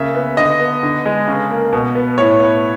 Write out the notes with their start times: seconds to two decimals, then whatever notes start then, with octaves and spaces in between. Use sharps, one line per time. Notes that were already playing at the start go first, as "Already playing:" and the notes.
Already playing: C#3 A#3 E5
0.15 B3
0.37 D3 D#5
0.60 B3
0.83 D3
1.05 G#3
1.28 C#3
1.51 A#3
1.73 B2
1.95 B3
2.18 A2 C#5
2.40 B3